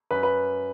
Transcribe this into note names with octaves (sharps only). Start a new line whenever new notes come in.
F#2 B4
B4